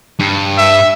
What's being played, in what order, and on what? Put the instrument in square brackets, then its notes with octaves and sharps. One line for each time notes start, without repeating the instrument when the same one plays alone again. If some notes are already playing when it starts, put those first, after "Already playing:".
[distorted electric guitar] G2
[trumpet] E5